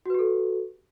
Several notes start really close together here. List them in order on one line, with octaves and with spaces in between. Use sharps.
F#4 B4 G4 A4